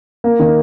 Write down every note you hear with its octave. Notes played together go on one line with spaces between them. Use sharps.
A#3
D#3